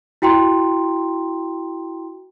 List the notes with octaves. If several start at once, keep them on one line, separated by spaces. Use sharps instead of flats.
E4 F#4 G5 A#5 C6